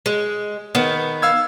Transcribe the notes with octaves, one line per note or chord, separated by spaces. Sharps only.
G#3
D#3 B3
F5 E6 G#6